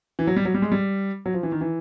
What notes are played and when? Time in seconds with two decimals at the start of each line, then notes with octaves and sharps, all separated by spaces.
0.19 E3
0.27 F#3
0.36 G3
0.45 F#3
0.54 G3
0.62 G#3
0.72 G3
1.26 F#3
1.34 F3
1.43 E3
1.52 D#3
1.61 E3